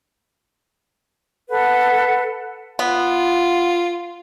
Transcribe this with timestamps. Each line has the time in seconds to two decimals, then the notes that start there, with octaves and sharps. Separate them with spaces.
1.49 A4 B4 F#5
2.79 B3 F4